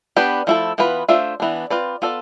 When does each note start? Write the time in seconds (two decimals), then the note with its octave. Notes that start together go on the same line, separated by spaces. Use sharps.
0.16 B3 D4 G4 B4
0.47 F3 A3 E4 A4
0.78 E3 B3 F4 B4
1.08 A3 D4 F4 C5 E5
1.40 E3 B3 D4
1.70 C4 F4 B4 D5
2.02 B3 F4 A4 D5